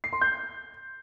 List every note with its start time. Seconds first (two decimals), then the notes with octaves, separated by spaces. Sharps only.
0.04 C7
0.13 C6
0.21 G6